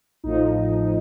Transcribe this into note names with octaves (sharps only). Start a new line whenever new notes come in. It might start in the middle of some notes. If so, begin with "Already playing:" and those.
A1 A2 F3 D#4